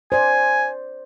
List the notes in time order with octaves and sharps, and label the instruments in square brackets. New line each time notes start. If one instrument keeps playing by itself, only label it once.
[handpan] C5 D5 [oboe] G#5